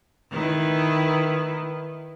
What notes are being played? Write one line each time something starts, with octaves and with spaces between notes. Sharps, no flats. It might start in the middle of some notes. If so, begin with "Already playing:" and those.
D#3 E4 B4